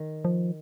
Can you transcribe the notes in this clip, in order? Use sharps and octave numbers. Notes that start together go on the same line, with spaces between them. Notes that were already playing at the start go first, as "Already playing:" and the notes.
Already playing: D#3
F3